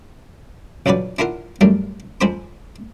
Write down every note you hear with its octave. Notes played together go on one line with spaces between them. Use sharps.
A#1 F2 C#3 F#3 B4 D5
D4 E4 F4 A#4 F#5
F#2 G3 A3 D4 A#4
F2 G#3 G#4 C5 B5 D6